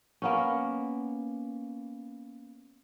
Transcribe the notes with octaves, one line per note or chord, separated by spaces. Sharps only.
A#3 B3 C#4